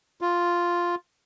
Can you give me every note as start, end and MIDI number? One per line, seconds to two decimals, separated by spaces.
0.21 0.95 65